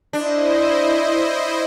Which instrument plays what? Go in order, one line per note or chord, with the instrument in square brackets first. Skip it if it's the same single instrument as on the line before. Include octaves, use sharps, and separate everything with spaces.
[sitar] D4 [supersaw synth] E4 C5 D#5